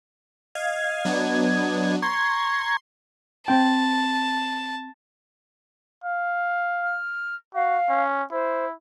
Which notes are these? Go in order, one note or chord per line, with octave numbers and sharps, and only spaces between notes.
D#5 F5 G#6
F#3 B3 D4
A#5 C6 C#6 G#6
C4 G5 A5
F5
F6
F#4 F5
C#4
E4 C5